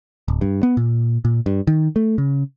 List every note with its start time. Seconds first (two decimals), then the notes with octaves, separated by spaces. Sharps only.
0.28 D1
0.41 G2
0.63 B3
0.77 A#2
1.25 A#2
1.46 G2
1.67 D#3
1.96 A3
2.18 C#3